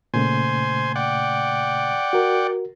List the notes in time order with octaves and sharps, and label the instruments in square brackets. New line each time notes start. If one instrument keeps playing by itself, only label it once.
[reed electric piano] A#2 C#3 A3 [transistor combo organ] C5 G#5
[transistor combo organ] D5 F#5 G5
[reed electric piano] F#4 A#4